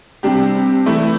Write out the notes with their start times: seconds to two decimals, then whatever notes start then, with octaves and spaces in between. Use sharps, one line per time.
0.23 C3 G3 D4 G4
0.86 E3 A3 E4